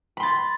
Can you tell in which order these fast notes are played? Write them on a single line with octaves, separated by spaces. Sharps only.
B5 C6 A6